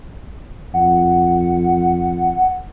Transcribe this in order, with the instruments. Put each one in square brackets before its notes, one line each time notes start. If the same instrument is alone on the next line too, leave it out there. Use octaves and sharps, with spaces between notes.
[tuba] F2 [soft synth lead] F#5